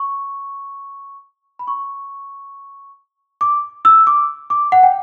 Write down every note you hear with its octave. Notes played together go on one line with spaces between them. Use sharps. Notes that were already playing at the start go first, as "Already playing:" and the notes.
Already playing: C#6
B5
C#6
D6
E6
D6
D6
F#5
G5